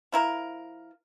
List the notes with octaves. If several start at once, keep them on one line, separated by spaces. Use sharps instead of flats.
F3 E4 A#4